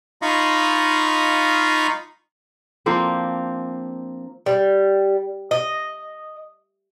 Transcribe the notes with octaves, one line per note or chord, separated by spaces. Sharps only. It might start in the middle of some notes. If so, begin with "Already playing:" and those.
D#4 F4 D#5 F5 B5 C#6
F3 A#3 C4 D4
G3
D#5